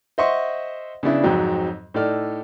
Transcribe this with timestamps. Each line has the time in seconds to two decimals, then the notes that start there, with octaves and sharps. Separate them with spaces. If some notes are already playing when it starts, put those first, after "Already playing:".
0.18 C5 D#5 E5 F#5 C6 C#6
1.03 C#3 B3 D4 E4
1.23 F2 G#2 F#3 C4
1.94 A2 D#4 A4 D5 F6